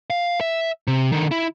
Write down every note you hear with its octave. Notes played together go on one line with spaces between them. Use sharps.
F5
E5
C3
D3 D#3
E4